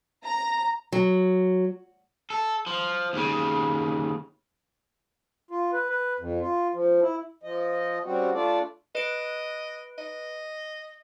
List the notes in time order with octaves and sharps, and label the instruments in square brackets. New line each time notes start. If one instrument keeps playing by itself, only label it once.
[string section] A#5
[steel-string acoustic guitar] F#3
[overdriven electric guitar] A4
F3
D#2 C#3
[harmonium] F4
B4
B4
F2
F4
F3
E4
F3 D#5
C#3 G3 C4 F#4
A3 D4 F4 A4 D5
[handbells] B4 D7 [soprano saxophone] D#5
[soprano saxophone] D#5